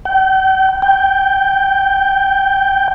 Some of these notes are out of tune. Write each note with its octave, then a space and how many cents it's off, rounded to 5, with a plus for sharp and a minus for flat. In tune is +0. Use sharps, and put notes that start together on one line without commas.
G5 -35
G5 -5